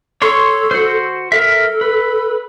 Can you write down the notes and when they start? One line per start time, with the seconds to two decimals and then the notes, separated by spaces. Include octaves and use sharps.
0.22 A4 C#5 C6 C#6
0.71 F#4 C5
1.32 A4 A#4 E5
1.81 B4